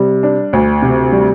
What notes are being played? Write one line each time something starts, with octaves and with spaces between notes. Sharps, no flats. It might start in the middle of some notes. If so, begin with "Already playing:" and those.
Already playing: C3 G3
D4
D2
C3
G3